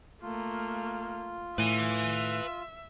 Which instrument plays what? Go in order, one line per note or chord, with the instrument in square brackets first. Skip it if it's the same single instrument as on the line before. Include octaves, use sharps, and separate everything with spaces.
[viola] A3 A#3 [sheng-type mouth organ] F4
[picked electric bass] A2 [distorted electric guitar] B4 G#5 [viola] E5